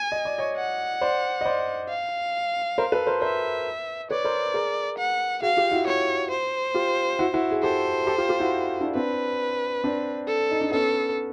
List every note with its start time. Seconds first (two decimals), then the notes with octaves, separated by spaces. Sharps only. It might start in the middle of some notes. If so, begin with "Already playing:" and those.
Already playing: G#5
0.12 D#5
0.25 D5
0.38 C#5 D#5
0.57 F#5
1.01 C5 D5
1.41 D#5
1.45 C5 D5
1.89 F5
2.78 A#4 C5
2.92 A4 B4
3.07 A#4 C5
3.21 A#4 C5 E5
4.10 B4 C#5 D5
4.24 A#4 C5
4.54 G#4 A#4
4.98 F#5
5.42 F#4 G#4 F5
5.57 F4 G4
5.72 E4 F#4
5.87 C#5
6.31 C5
6.74 F4 G4
7.19 E4 F#4
7.34 E4 F#4
7.51 G#4
7.63 G4 A4 C5
8.07 G4 A4
8.18 F4 G4
8.29 F4 G4
8.40 E4 F#4
8.81 D4 E4
8.95 C4 D4 B4
9.84 C4 D4
10.27 A4
10.51 D#4
10.61 D4
10.72 B3 C#4 A4